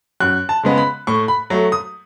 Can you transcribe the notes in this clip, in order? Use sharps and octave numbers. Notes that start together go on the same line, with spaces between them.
F#2 F#6
A5
C#3 G#3 B3
B5
A2 C#6
B5
F#3 A3
D#6